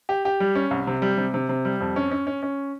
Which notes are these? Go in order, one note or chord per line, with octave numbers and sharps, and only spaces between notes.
G4
G4
G3
C#4
C2
C3
G3
C3
C3
C3
G3
F2
C#4
C#4
C#4
C#4